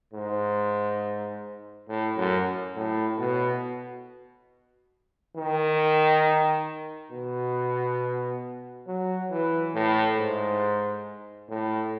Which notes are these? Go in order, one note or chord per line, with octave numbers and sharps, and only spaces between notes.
G#2
A2
F#2
A2
B2
D#3
B2
F#3
E3
A2
G#2
A2